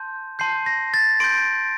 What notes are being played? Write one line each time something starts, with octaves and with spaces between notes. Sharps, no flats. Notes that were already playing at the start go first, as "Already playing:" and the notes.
Already playing: A5 C6 G6
A5 C6 G6 C7
A#6
A6
C6 G6 D7